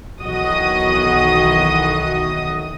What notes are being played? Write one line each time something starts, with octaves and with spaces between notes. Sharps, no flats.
B1 D#3 E3 F#4 D#5 D#6